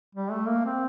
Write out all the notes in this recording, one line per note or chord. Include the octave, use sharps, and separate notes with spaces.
G3
A3
A#3
C4